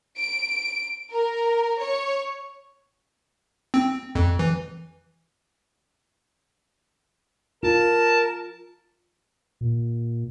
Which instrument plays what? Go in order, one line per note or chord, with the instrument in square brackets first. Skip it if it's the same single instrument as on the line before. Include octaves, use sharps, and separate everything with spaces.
[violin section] D7
A#4
C#5
[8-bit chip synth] C4
F2
E3
[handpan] F4 [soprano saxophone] A#4 [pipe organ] A5
[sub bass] A#2